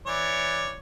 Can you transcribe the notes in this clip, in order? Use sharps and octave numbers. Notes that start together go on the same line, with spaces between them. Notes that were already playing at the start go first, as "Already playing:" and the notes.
E3 C#5 D5